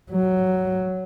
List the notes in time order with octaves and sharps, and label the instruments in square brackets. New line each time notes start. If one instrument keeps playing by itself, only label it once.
[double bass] F#3